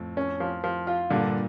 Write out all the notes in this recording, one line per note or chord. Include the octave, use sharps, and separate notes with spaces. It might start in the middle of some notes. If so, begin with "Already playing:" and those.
Already playing: F2 A2
C#4
F3
F3
F4
G2 A#2 D3